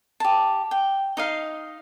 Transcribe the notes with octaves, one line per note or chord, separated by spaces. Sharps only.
G4 A5
G5
D#4 D#5 F5